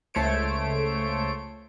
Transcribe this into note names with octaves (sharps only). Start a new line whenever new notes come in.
C#2 A3 C5 C#5 D7